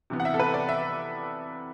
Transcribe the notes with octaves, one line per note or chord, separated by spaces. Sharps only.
C3 E3 B3
F#5
E5
A4
B4
D5
E5